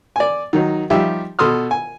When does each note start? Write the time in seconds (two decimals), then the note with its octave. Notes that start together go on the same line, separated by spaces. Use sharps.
0.16 D5 G#5
0.53 D#3 F#3 D#4
0.90 F3 G3 D#4 G4 E5
1.39 B2 A4 C6 D#6 F6
1.71 G#5